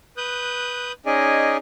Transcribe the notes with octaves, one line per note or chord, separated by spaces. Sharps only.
B4 D#6 F#6 G6
C#4 D#4 G#4 D5 D#5 G#5